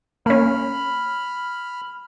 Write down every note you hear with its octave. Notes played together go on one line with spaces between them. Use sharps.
A#3 C#4 B5 F6